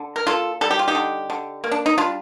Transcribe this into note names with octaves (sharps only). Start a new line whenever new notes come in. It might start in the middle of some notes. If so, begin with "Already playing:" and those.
Already playing: D3
A#4
A#3 F4 A4
G3 A4
G4
F4
D#4 G4
D3
D3
A#3
D4
D#4
G3 D4 F4